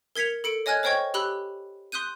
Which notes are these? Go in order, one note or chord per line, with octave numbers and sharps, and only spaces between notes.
A#4 G#6 B6 C#7 F7
A4 C#7 D7
C#5 D#5 G#5 F6 F#6 G#6
C5 C#5 D#5 G5 C#6 G#6
G4 B5 E6 F#6 G7
C6 D#6 F#6 G6 D#7